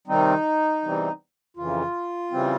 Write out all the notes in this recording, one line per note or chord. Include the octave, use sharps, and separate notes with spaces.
C3 D#3 G3 C4 D#4
E2 C3 E3 G3 C4
F2 C#3 E3 F4
C#3 E3 G3 C4